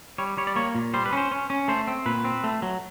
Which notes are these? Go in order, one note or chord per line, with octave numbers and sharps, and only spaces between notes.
G3 C#5
G3 C#5
D5
A#3 C#5
A#2
G3 C5
B4
C#4 C5
C#4
C#4
A3 C5
C4
A#2 B4
C4
A3
F#3